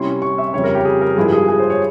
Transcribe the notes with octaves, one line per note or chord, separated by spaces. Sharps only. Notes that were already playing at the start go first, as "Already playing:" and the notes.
Already playing: C3 G3 C#4 E4 C6
C#6
E5
F2 C#3 G3 C#5
A#4
G4
G#4
A#4
G2 F3 G#3 E4 G#4
G#4
G#4
C5
C#5